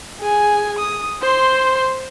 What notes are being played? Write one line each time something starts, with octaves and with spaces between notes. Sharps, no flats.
G#4 G#5
D#6
C5 C6